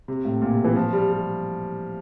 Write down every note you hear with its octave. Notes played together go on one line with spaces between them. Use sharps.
C3
A2
A#2
C3
E3
F3
G3
G3